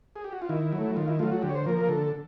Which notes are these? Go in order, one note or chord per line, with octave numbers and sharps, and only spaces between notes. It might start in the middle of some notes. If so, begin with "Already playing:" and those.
G#4
G4
F#4
F4
D#3 E4
F#3
A3
D#3 F4
E4
F#3 A3 F4
F#4
D3 G4
C#5
C5
F3 A#3 A#4
A#4
D3 A4